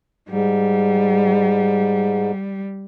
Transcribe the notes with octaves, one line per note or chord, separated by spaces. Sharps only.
G#2 G3